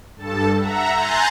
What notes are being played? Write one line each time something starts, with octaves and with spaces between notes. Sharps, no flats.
G2 A4 A5
E5 F#5 A#5
G#5 A#5 C6 F#6 G6 A6